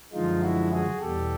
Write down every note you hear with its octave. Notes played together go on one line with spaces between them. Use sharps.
F#2 D3 F3 G#3 D#4 F4
E4 F#4
F#4 G#4
E2 B2 G3 G4 A4